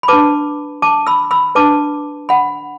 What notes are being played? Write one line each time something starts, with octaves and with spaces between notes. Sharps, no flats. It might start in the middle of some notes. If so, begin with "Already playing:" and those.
B5
D4 B4 A5 D6
A5 D6
B5 E6
B5 E6
D4 B4 A5 D6
F#5 B5